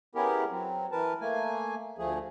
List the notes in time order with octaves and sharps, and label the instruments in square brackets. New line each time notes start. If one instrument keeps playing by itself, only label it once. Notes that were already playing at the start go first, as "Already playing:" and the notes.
[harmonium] B3 C#4 E4 G4 G#4 A#4
F#3 C4
E3 A#4 B4 A5
A3 A#3 G#5
D2 F3 A3 G#4